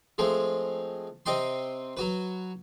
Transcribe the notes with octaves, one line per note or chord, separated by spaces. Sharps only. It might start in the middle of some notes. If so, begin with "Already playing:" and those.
F3 G#3 A3 C4
C3 C4 D#5 G5 C6
F#3 F#4 B4